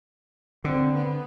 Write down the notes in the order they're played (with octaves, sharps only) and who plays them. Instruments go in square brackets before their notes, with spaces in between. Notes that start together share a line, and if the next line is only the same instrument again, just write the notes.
[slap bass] D3 [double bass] C4
[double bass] B3